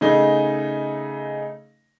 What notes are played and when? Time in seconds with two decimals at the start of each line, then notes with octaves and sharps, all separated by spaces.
0.01 C#3 A3 D#4 G#4 D#5